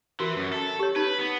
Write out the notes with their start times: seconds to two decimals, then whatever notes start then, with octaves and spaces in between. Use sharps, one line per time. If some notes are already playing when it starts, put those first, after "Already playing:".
0.20 E3 F#4 A#4
0.36 F#2
0.53 A4
0.79 G4 C#5
0.96 D#4 B4
1.20 B3